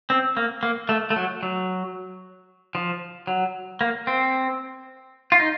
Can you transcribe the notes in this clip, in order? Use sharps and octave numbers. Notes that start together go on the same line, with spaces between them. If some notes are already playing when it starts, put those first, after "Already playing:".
C4
A#3
A#3
A3
A3
F#3
F#3
F3
F#3
A#3
C4
F4
D#4